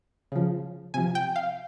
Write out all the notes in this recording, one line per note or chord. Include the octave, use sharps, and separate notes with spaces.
C#3 F3
C3 F3 G#5
G5
F5